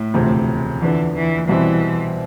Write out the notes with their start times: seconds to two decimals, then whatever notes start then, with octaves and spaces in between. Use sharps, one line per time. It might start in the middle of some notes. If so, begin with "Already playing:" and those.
Already playing: A2
0.14 E1 D2 C3 F3
0.81 E2 D3 E3 F3 B3
1.15 E3
1.49 C2 B2 E3 G3 C4 E4